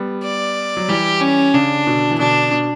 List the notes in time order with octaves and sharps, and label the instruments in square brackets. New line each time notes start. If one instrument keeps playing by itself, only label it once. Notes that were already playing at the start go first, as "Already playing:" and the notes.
Already playing: [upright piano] G3 B3
[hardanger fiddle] D5
[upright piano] F#3
[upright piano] E3 G3 [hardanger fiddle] G4
[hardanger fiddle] C#4
[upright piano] C#3 [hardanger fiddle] D4
[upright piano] B2 D3
E3
[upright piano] B2 D3 [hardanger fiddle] D4
[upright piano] B2